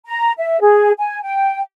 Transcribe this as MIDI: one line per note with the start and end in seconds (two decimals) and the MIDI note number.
0.06 0.32 82
0.38 0.59 76
0.61 0.92 68
0.98 1.21 80
1.23 1.60 79